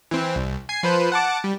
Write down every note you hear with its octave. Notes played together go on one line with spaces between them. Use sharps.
E3 C4
C2
G#5 G#6 C7
F3 B4 C5
F#5 A5 D6
G3